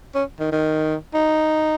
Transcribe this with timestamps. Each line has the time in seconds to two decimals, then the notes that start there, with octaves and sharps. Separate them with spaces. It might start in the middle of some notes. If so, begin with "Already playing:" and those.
0.15 C#4
0.39 D#3
0.52 D#3
1.14 D#4